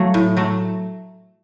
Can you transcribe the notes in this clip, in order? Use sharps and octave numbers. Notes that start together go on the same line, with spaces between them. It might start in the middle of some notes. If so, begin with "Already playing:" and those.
Already playing: F#3 A3 F5
A2
F#3 A3